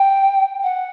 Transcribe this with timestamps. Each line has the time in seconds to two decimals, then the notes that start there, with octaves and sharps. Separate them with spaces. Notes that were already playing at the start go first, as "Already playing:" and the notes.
Already playing: G5
0.63 F#5